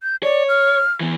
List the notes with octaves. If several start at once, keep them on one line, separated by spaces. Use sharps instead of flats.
G6
C#5 D5
F6
E3 B3